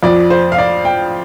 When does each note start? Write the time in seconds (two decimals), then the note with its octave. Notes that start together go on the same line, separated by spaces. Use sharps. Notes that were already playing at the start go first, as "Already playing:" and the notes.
0.03 F2 F3 D5
0.30 C5
0.52 F5
0.58 D5
0.85 G5